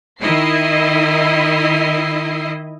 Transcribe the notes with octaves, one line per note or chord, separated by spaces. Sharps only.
D#3 E4 D#5 C7